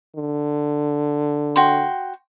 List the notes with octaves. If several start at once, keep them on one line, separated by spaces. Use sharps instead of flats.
D3
F#4 G5 C6